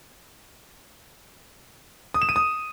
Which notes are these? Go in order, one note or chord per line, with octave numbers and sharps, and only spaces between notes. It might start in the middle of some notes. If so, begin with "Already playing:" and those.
D#6
E7
D#7
D#6